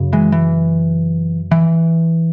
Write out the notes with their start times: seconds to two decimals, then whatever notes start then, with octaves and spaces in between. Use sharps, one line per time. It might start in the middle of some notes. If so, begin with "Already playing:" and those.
Already playing: F#2 C#3
0.13 E3 G#3
0.32 E3
1.51 E3